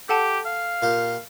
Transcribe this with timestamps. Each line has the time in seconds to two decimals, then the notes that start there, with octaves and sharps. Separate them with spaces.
0.09 G4 A4 F#5 A5
0.45 F5
0.82 A#2 F4 G4